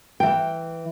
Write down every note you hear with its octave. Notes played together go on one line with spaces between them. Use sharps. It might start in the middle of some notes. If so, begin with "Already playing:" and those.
E3 G5